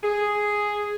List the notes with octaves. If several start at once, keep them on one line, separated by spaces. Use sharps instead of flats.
G#4